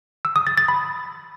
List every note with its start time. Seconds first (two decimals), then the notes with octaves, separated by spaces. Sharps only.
0.25 E6
0.36 D#6
0.47 A6
0.58 A6
0.68 B5